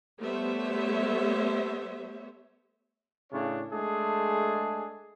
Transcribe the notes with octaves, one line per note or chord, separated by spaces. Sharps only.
G3 A3 B3 C5 C#5 E5
A2 C#3 D4 C#5
G#3 A3 D4 G#4